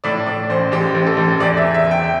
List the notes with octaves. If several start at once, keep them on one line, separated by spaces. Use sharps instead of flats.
A2 D5
A2 D5
A1 C5
A1 G4
A1
A4
A1
E2 D5
E5
E2
E5
E2
G5